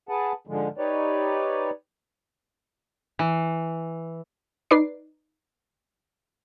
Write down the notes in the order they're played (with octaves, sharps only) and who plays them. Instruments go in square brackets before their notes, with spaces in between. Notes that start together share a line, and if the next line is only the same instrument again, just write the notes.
[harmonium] G#4 B4 F#5 A5
G#2 D3 F3 G#3
D#4 G4 B4 C#5 D5
[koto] E3
[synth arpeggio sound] D#4 B4 D5 D6 C7